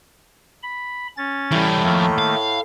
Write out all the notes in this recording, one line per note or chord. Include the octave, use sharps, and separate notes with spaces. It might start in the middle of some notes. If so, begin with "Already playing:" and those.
B5
C#4 A6
A2 E3 G3
F2 D#3 A3 A#3
F5